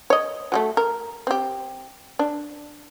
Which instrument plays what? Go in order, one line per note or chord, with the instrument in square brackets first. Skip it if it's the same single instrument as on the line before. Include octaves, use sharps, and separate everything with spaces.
[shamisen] C#5 D#5
F#3 G#3 A3
A#4
C4 G4
D4